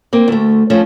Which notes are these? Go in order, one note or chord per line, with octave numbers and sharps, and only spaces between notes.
A#3 C4
D2 A3
F3 A3 C#4